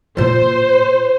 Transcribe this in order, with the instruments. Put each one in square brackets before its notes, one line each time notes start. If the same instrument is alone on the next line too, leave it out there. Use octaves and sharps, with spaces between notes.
[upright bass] A#2 F4 [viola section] C5